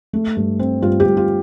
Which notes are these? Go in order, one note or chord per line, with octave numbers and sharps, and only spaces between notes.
A3
G2
C4
G2 F4
G4
G2
F4